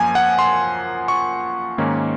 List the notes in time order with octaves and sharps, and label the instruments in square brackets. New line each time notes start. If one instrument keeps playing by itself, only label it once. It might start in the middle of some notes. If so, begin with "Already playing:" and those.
Already playing: [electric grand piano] F#2 F3 A#3 G#5
F#5
C6
C#6
G#2 D#3 A#3 C#4